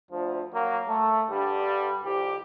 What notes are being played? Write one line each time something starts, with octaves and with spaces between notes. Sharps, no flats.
D2 F3
F#3 A#3
A3
G2 D3 G3
C2 F2 G4